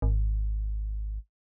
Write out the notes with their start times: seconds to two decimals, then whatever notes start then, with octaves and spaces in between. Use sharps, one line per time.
0.02 G#1